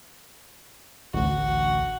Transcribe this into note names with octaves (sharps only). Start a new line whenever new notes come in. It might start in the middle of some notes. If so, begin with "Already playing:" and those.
A1 D2 F#4